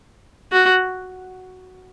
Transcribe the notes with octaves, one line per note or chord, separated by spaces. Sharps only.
F#4